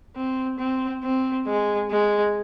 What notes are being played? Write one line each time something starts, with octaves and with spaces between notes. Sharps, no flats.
C4
C4
C4
G#3
G#3